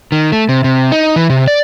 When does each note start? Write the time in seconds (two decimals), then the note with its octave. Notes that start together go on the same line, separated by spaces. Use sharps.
0.12 D#3
0.32 A3
0.49 C3
0.64 C3
0.92 D#4
1.16 E3
1.30 C3
1.48 D5